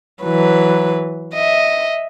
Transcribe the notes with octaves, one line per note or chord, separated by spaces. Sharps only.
E3 F#3 B4
D#5 E5